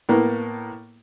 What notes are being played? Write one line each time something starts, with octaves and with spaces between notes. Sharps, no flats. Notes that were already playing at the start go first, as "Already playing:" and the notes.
A2 A#3 B3